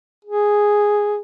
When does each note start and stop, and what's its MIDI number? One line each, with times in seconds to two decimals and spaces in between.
0.25 1.20 68